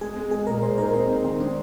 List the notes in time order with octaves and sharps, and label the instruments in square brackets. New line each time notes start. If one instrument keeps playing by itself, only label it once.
[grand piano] G#3 [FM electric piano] G#4
[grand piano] G#3
[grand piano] G#3 [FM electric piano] G#4
[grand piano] A#2 [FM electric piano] A#4
[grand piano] A#2 [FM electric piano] C5
[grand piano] D#4 [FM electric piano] A#4
[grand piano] C4 [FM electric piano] C5
[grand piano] D#4
[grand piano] D#3 [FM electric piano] C5
[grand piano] G#3 [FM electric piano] D4